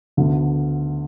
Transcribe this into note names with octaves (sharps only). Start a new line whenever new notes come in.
D2 D3 B3